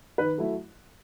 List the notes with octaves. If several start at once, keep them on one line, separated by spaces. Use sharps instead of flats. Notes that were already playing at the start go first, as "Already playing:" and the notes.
D#3 B4
F#3 A3 E4